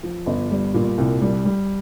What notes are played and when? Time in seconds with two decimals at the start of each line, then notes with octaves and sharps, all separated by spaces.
0.03 F3
0.26 G1
0.51 G3
0.74 A#2
0.98 C2
1.21 G3
1.45 G3